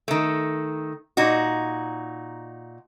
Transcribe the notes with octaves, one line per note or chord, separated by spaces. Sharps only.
D#3 A3
A#2 D#4 F#4